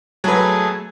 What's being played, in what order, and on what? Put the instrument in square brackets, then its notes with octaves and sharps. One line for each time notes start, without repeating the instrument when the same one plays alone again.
[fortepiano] F#3 B4 [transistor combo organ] A3 G#4